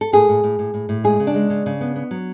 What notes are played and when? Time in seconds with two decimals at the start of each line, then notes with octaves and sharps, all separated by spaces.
0.01 A4
0.13 A2 G#4
0.29 A2
0.44 A2
0.59 A2
0.74 A2
0.89 A2
1.04 G#3 G#4
1.20 C#3
1.27 D4
1.34 G#3
1.50 C#3
1.66 C#3
1.81 B3
1.96 B3
2.11 F#3